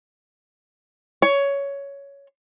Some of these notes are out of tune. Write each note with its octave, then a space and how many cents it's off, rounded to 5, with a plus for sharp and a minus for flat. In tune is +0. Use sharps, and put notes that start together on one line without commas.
C#5 +10